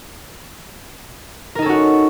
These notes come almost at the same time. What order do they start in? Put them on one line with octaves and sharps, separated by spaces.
A#4 D#4 A4 C#4 F#4